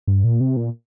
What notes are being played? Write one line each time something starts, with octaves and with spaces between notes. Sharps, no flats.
G2
A#2
C3
A#2